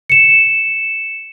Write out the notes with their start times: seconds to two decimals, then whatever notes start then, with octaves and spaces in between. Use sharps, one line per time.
0.10 C#7 E7